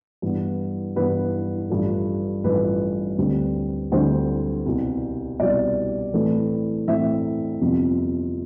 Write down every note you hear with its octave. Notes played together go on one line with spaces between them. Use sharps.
G2 E3 B3
G2 E3 B3 B4
A1 G2 F3 A3
A1 G2 F3 A3 B4
D2 D3 G3 C4
D2 D3 G3 C4 C5
C2 B2 G3
C2 B2 G3 D5
A2 E3 A3 C4 E4
A2 E3 A3 C4 E4 E5
G1 F2 C3